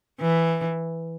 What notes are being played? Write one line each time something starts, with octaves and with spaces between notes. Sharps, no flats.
E3